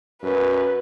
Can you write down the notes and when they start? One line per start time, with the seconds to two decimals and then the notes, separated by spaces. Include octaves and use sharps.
0.23 F#2 B4